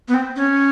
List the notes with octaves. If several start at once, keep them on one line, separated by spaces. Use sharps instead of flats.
B3
C4
C#4